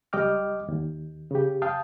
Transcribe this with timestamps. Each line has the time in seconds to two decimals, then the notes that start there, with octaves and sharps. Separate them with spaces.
0.13 C#2 G3 D#5 G5 D6 F6
0.68 D#2
1.31 C#3 G4
1.62 F5 G5 A5 D#6